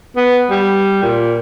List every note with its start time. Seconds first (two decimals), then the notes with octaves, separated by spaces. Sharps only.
0.16 B3
0.51 G3
1.03 A#2